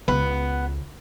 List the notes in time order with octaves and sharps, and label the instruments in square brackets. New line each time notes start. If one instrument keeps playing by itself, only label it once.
[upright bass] C#2 [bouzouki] B3